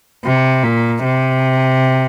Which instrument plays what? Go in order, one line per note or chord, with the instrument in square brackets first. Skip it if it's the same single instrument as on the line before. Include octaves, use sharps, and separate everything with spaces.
[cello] C3
A#2
C3